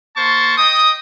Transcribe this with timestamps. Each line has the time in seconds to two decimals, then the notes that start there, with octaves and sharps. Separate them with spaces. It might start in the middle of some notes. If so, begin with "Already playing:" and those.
0.17 A#3 C5 A5 C#6
0.58 D#5 G5 D#6